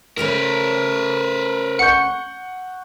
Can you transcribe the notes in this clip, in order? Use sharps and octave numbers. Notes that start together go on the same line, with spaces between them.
C#3 A3 C#4 A#4 B4
F#5 C#6 G6 C#7